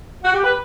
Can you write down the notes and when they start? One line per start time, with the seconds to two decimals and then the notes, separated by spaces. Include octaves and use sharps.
0.23 F#4
0.34 G4
0.44 B4